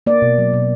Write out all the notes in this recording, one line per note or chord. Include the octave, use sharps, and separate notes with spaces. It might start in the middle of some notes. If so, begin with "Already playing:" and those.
A#3 D5
B2
F#3
B2